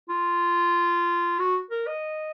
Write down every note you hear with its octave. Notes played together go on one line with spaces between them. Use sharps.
F4
F#4
A#4
D#5